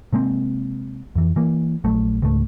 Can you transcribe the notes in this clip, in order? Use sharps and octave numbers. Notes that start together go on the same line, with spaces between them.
C3 G#3 A#3 C4
F2 E3
E3 A#3
A#1 F#3 A3
C#2 G#2 A3